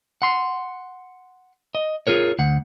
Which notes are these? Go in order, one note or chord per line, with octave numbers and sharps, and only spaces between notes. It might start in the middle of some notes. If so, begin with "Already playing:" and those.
F#5 C6
D#5
F4 G#4 A#4 C#5
D2 F#5